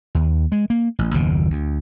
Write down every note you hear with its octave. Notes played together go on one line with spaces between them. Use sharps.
D#2
G#3
A#3
A1
F#1 D#2 B2
D2